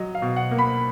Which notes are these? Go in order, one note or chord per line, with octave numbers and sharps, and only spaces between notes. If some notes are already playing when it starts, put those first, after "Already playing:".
Already playing: F#3 D#5
F5
B2
F#5
A#3
B5